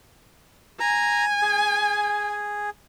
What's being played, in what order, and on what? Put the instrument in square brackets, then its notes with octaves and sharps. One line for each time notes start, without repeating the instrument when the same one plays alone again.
[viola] G#5 [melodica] A#5
[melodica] G#4